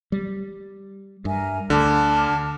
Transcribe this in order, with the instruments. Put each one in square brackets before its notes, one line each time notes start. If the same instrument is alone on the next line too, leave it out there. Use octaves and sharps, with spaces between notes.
[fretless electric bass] G3
[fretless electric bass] G2 [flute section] A#4 E5 G#5
[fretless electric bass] D2 [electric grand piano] D3 [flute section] A5 D6 F6